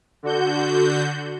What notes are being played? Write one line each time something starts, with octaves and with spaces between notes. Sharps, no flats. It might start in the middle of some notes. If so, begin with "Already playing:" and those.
D3 F#4 G6